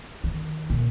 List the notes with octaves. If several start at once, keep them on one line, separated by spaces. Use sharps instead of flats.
D#3
A#2